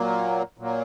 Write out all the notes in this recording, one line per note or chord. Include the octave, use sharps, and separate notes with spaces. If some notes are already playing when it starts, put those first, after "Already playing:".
Already playing: A#2 F#3 A#3
A#2 F#3 A#3